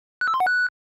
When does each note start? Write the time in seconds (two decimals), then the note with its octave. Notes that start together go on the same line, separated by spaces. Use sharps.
0.21 F#6
0.28 E6
0.34 C6
0.40 F#5
0.47 F#6